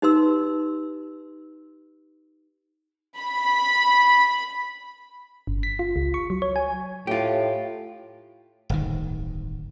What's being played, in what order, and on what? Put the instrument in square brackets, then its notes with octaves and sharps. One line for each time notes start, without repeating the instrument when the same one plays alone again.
[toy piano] D#4 G4 B4 C6 E6
[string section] B5
[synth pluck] G1
B6
F4
C#2
C#6
F#3
C#5
G#5
[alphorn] A2 [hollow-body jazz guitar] F4 G4
[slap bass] D1 G1 D#3